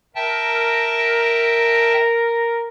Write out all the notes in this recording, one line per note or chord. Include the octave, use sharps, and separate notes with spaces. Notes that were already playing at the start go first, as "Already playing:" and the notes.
A#4 E5 G5 A5